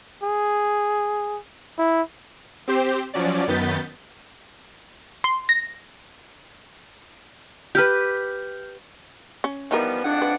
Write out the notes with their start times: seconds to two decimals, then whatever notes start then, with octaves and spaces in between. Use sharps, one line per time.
0.23 G#4
1.79 E4
2.68 C4 G4 C5
3.14 F3 F#3 C#4 D5
3.48 F#2 D#3 B3 G6 A6 B6
5.24 C6
5.49 A#6
7.75 G4 B4 F6 G6
9.44 C#4
9.71 E3 F3 G3 B3 D#4 A#4
10.04 F2 G#2 D4 F#5
10.22 B4